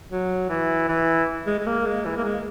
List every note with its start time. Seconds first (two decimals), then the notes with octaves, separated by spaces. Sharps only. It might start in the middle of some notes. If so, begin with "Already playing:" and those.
0.11 F#3
0.49 E3
0.88 E3
1.46 G#3
1.59 G#3
1.66 A#3
1.85 G#3
2.05 E3
2.16 A#3
2.24 G#3